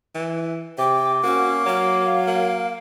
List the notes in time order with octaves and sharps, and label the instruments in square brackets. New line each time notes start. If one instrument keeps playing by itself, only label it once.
[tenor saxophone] E3
[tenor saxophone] C3 [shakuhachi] G5 [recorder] D6
[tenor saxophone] A#3 [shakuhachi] C#4 [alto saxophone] F#4
[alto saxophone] F#3 [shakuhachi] F5
[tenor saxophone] A#3